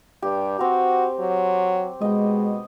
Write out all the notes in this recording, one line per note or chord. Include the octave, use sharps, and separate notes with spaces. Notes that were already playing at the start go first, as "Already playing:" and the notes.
G2 G4
C4 F#4 A#5
F#3
B2 G#3 D#5 G5